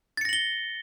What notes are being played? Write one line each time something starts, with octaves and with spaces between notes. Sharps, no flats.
A6 A#6 C#7 F#7 G7